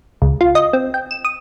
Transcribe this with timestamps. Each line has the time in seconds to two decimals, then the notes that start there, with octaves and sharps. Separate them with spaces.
0.22 C#2
0.41 F4
0.55 D#5
0.73 C4
0.94 G5
1.11 E7
1.25 D#6